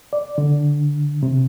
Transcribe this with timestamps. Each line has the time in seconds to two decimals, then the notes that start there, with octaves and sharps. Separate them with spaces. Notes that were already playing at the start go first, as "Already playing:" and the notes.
0.13 D5
0.38 D3
1.23 C3